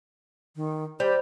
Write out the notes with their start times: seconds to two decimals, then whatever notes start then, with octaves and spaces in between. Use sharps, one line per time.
0.56 D#3
1.00 G3 G4 C5